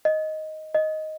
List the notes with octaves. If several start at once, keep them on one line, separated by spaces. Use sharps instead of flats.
D#5
D#5